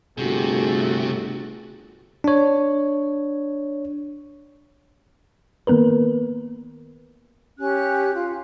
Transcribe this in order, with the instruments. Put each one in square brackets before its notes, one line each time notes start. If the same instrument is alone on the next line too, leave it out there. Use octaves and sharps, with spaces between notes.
[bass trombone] G1 [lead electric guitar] C3 [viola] A3 F#4 [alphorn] G#4
[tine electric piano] D4 C#5
[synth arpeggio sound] D#3 A#3 B3 A#4 B4
[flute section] C#4 G4 F#6
F4